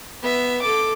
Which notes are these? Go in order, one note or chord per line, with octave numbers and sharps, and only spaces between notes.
B3 E5
A4 D6